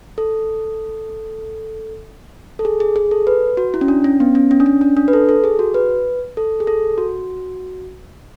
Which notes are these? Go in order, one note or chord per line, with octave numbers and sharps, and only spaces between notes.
A4
A4
G#4
G#4
G#4
A4
B4
F#4
E4
C#4
D4
C#4
B3
C#4
C#4
D4
C#4
D4
D4
B4
A4
A4
G#4
F#4
B4
A4
G#4
A4
F#4